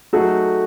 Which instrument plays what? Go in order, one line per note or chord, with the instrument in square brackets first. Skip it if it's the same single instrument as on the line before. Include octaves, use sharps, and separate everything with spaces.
[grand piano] F#3 A3 D#4 G#4 [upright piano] F#4 A4